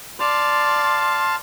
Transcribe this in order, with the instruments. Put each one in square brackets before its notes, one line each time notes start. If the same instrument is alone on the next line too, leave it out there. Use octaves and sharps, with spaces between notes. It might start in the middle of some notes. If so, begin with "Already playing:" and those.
[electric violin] D5 [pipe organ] F5 A5 [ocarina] C6